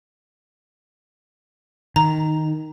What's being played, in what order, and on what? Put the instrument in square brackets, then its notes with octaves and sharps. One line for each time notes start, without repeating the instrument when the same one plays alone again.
[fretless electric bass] D#3 [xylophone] A#5